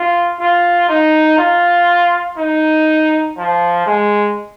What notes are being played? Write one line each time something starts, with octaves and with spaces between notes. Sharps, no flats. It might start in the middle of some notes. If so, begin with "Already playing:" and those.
Already playing: F4
F4
D#4
F4
D#4
F3
G#3